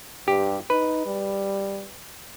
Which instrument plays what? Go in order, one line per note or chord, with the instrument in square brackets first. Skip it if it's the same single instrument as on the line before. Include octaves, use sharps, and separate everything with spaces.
[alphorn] G2 [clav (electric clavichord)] G4
[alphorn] D#4 [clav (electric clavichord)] B4
[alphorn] G3